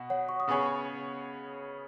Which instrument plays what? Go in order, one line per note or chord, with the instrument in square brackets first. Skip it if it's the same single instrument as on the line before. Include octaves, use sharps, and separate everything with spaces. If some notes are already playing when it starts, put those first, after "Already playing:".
Already playing: [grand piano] B2 F#4
[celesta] C#5 F#5
C#6
D#6
[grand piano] C#3 B3 G#4 C#5 [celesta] G#5 C#6